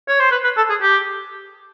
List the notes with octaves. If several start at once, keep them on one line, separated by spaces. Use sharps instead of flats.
C#5
C5
B4
B4
A4
G#4
G4